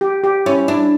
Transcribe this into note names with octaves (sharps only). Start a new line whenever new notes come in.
G4
G4
C#4 E4
D4 E4